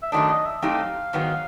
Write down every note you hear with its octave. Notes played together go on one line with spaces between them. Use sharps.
E5
F#2 D#3 F#3 A3 D4 D#5
D#5
E5
F#3 A3 C4 D#4 G4 F5
G#2 D#3 F#3 B3